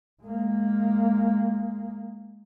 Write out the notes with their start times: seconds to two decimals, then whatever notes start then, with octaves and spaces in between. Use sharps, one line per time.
0.23 G#3 A#3